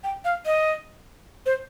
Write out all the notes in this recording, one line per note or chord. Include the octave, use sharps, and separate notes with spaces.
G5
F5
D#5
C5